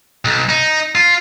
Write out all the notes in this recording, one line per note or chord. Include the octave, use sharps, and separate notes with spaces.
B1
D#4
F4